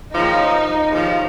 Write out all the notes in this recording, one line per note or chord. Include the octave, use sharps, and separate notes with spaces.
D#2 C#3 F3 D#4
D#2 C#3 F3